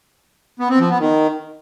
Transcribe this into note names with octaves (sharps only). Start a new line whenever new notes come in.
B3
C4
F3
B3
D#3